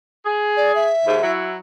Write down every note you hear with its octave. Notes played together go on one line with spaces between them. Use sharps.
G#4
D5
E5
D#2 G#2
F#3 E4